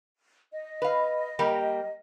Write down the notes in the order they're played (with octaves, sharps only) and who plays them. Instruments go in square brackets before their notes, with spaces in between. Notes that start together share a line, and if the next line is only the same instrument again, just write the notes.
[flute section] D#5
[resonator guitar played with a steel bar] B4 F5
G3 A#3 G4